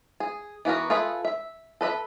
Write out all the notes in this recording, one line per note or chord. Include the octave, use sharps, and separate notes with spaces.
G#4
E3 B3 F#4 A#4
F4 G#4 A4 B4 E5
E5
A4 B4 D#5 E5